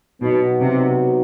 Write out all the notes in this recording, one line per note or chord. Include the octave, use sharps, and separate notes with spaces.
B2 F#3 B3 D#4 F#4
C3